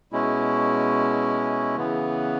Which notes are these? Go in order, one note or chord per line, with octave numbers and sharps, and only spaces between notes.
B2 G#3 C#4 E4
C#3 E3 B3